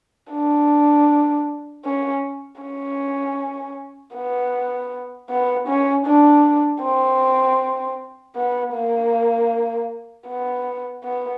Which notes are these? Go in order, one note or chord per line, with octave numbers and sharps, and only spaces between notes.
D4
C#4
C#4
B3
B3
C#4
D4
C4
B3
A#3
B3
B3